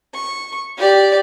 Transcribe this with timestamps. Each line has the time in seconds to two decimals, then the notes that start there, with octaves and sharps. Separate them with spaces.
0.14 C#6
0.77 G4 D5